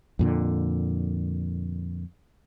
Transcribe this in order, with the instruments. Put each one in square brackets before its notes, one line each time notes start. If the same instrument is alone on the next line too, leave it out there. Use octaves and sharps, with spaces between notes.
[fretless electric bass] F2 A#2 D3